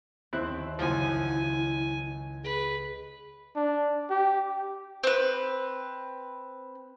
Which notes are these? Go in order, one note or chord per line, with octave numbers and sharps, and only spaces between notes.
D#2 C4 E4 F#6
C#2 F#2 F3 E4 G#5
G#4 B4
D4
G4
C4 B4